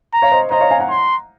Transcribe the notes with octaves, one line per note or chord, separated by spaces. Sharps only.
A#5
C#5 F5
C5 D#5
C5 D#5 A#5
C#5 F5
F5 G#5
F#5 A#5
C6